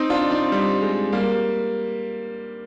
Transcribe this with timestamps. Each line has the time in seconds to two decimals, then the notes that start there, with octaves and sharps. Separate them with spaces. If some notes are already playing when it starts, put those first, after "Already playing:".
Already playing: C4 D#4
0.10 D4 F4
0.31 C4 D#4
0.52 G3
0.81 G#3
1.13 G3 A#3